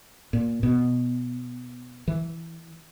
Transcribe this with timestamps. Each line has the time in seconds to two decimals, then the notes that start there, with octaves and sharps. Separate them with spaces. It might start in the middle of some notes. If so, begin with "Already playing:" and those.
0.33 A#2
0.63 B2
2.08 E3